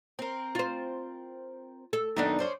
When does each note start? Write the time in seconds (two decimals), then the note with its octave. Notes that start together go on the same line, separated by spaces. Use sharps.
0.19 C4 A#4
0.55 F4 C5
1.93 A4
2.16 F#2 D#3 B3 D4 D#4
2.39 C#4 C5 D5